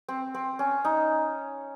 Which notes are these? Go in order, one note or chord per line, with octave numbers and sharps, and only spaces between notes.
C4
C4
C#4
D#4